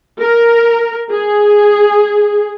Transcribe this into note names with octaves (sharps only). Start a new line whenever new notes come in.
A#4
G#4